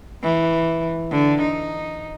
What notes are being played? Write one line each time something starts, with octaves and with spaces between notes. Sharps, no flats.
E3
D3
D#4